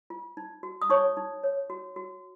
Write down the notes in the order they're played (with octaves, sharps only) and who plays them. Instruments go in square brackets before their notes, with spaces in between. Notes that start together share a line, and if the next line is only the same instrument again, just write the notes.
[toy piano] F4
D#4
F#4
D#6
D#4 C#5 C#6
D#4
C#5
F#4
F#4